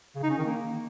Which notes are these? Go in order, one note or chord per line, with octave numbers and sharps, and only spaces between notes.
C#3
D#4
C#4
D#3
A#3